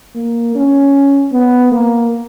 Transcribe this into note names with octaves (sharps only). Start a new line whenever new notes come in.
A#3
C#4
B3
A#3